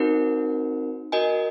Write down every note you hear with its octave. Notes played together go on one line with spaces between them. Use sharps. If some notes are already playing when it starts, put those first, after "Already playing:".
Already playing: C4 D#4 F#4 A#4
F#4 A#4 D#5 G#5